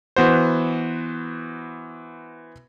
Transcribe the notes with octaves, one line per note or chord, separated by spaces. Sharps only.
E3 B3 F#4 C5